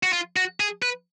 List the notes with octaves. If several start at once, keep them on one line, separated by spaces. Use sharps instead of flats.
F#4
F4
F#4
G#4
B4